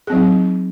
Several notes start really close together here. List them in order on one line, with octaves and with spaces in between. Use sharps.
G#4 C4 F#3 D#4